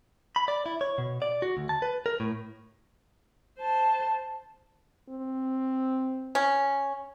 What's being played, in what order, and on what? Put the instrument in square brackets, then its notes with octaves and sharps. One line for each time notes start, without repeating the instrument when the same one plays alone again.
[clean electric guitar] B5
D5
E4
C#5
B2
D5
F#4
D2
A5
B4
A#4
A2
[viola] C5 A5
[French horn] C4
[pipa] C#4